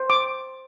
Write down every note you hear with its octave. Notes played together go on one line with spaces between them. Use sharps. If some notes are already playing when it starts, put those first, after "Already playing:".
Already playing: C5
D6